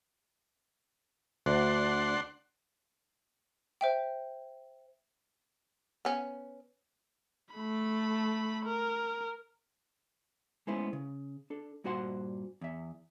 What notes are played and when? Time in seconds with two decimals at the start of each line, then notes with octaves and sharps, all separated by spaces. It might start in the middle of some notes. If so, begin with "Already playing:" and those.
1.46 D2 D4 F#5 C6
3.81 C5 E5 G5
6.05 B3 C#4
7.55 A3 B5
8.66 A#4
10.67 G#3 A3 B3 C#4 E4 C5
10.93 C#3
11.50 D4 A4
11.84 G2 A#2 F#4 C5 F#5 C6
12.61 E2 E5